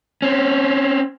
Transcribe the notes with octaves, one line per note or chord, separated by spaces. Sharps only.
C4 C#4